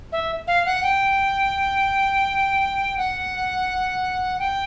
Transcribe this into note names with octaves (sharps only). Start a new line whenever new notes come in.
E5
F5
F#5
G5
F#5
G5